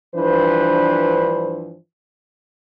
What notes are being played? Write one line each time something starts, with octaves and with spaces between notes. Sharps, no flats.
G2 E3 F3 D4 B4 C5